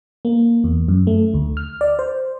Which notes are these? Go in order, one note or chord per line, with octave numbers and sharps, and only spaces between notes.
A#3
E2
F#2
A3
D2
F6
D5
C5